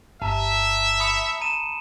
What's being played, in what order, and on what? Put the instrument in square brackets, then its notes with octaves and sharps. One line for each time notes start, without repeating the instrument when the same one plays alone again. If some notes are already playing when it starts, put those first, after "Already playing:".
[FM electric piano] G1 [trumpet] E5 [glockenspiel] A5 A#5
[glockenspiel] B5 D#6 C#7
A#5 D#7 E7